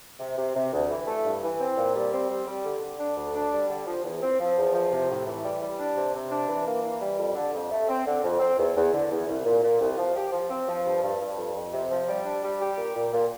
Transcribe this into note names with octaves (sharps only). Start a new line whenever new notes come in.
C3
C3
C3
D2
E3
A3
G2
E3
C4
A#2
G3
C4
G3
G3
D3
D3
D4
D2
D4
G3
D3
F3
E2
C4
F3
E2
F3
C3
A2
E3
G3
G3
D4
C3
C3
D4
E3
A#3
E3
G3
F2
D3
F2
A3
C4
D3
F2
C4
E2
E2
D3
E2
C2
A#2
A#2
C2
F3
G4
F3
C4
F3
G2
G2
G2
F2
F2
C3
F3
G3
D4
G3
G4
A#2
A#2
A#2